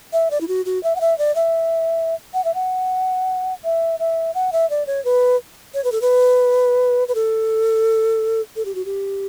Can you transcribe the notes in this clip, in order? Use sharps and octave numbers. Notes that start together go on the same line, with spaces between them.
E5
D5
E4
F#4
F#4
E5
F#5
E5
D5
E5
F#5
E5
F#5
E5
E5
F#5
E5
D5
C#5
B4
C#5
B4
A4
B4
B4
A4
A4
G4
F#4
G4